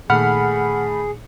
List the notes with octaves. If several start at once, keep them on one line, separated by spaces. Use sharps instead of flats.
A#2 D#3 A3 G#4 F#5 B5 F6 C#7